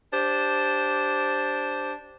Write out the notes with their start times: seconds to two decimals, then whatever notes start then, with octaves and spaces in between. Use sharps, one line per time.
0.12 D4 G4 C5